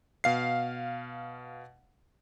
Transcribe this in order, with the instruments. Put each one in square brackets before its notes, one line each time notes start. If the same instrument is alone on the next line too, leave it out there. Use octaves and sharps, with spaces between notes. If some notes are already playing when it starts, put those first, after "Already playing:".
[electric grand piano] B2 F5 C7